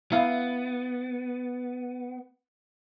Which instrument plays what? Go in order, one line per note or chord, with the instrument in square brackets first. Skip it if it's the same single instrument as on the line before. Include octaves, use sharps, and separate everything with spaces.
[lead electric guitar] B3 [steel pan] E4 F5